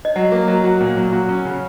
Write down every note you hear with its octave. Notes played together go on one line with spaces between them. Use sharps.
D#5
F#3 F#5
A#3
F#3
F#4
A#2 F#5
F#3
F#4
C#4
C#3